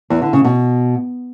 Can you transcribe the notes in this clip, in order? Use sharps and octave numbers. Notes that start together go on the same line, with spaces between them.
E2
D3
C#3
B2